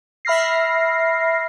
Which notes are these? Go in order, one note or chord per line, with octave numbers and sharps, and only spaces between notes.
E5 B5 F6 A#6 C7